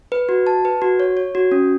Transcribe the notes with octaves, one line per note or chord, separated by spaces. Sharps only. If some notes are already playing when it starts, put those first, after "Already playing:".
B4
F#4
A5
B4
F#4
C#5
C#5
F#4
C#4